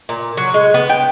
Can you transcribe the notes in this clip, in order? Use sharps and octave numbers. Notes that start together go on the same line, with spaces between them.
A#2
F#3
G#3
B3
G5